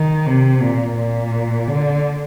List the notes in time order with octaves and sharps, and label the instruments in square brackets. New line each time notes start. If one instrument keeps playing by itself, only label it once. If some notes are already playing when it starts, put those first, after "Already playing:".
Already playing: [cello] D#3
C3
A#2
A#2
D3